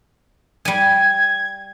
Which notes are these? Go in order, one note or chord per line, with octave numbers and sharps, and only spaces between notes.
G3 G#5 G#6